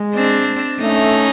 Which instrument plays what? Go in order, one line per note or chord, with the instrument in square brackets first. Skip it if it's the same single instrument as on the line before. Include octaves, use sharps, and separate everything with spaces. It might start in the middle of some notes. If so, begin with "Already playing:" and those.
Already playing: [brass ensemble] G#3
[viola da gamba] C4 D4
[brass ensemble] A3 [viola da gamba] C#4 D#4